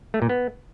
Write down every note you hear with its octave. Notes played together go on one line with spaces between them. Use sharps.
A3
A#2
B3